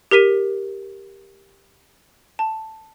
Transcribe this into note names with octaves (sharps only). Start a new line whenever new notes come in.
G4 A#4 B6 D#7
A5